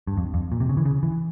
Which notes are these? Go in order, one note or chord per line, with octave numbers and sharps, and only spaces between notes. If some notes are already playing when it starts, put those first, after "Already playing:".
G2
F2
F2
A#2
C3
C#3
E3
C#3
E3